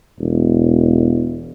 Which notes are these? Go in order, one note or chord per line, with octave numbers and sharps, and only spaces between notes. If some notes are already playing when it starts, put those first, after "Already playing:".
E1